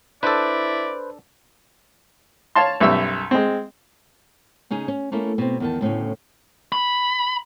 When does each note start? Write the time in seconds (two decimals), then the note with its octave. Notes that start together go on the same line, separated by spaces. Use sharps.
0.23 D4 E4 A4 B4 C5 D5
2.55 C#5 F5 A5 C6
2.81 B1 F#2 G3 E5 E6
3.31 G#3 C4
4.71 C#3 C#4 D#4 G#4
4.88 C#4
5.12 A3 A#3 C#4 E4
5.38 B2 C4
5.60 E2 D#3 A5
5.81 D2 A2 C#3 C#4
6.72 B5